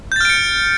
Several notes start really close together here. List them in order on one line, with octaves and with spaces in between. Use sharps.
G6 A6 F6 D7 C#7